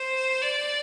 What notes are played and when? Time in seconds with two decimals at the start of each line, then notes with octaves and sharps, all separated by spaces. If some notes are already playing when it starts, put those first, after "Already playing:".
Already playing: C5
0.42 D5